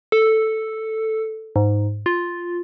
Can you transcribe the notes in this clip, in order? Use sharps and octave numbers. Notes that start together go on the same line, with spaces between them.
A4
G#2
F4